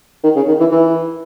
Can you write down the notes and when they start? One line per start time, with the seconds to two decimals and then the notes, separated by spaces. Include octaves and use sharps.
0.23 D#3
0.36 C#3
0.48 D#3
0.60 E3
0.71 E3